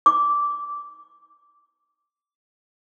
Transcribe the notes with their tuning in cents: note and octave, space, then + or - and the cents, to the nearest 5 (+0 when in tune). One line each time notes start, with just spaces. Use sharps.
D6 -15